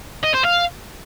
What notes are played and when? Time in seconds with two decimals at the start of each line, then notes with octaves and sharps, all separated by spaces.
0.23 D#5
0.34 C5
0.44 F5